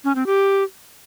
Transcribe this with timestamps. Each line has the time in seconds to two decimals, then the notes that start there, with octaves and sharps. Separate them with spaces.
0.04 C#4
0.15 C4
0.26 G4